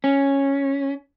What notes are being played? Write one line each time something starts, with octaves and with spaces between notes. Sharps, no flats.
C#4